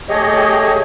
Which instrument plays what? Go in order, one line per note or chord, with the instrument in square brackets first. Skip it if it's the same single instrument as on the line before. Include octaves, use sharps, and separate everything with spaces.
[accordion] A3 G4 G#4 C#5 D#5